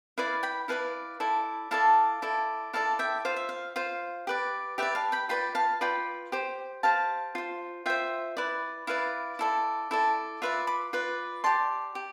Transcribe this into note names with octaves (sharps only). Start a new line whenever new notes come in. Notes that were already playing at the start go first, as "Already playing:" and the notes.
E4 B4 D5 F5
G5 B5
E4 B4 D5 F5 A5
E4 A4 D5
E4 A4 D5 F5 A5
E4 A4 D5
E4 A4 D5 F5 A5
E5 G5
F4 C5 F5
E5
F5
F4 C5 F5
G4 B4 D5
G4 B4 D5 E5 G5
F5 A5
G5 B5
F4 B4 D5 G5 B5
F5 A5
F4 B4 D5 G5 B5
G4 C5
G4 C5 F5 A5
F4 C5
F4 C5 E5 G5
E4 B4 D5
E4 B4 D5 F5
E4 A4 D5
E4 A4 D5
F4 B4 D5 E5
B5 D6
F4 B4 D5
G4 D5 A5 C6
G4